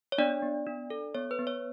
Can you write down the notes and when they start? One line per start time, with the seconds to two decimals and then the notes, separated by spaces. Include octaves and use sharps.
0.12 C#5
0.18 B3 D4 D5
0.42 B3
0.66 D4
0.90 A4
1.14 B3 C#5
1.31 B4
1.39 B3
1.47 C#5